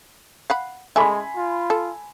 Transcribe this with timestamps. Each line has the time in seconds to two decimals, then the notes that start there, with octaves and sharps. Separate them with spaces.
0.50 F5 F#5 B5
0.96 G#3 A4 E5 G#5 B5 C6
1.36 F4
1.70 A4